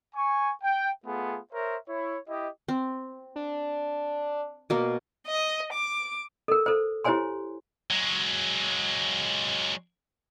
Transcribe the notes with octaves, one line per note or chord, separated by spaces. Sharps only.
G#5 C#6
G5
A3 B3 F4 G#4
A#4 C5 C#5 E5
E4 C#5
E4 G4 D#5
C4
D4
B2 A#3
D#5
D6
A4 A#4
A4 C5
E4 G4 C5 C#5 G#5 C6
F#3 G#3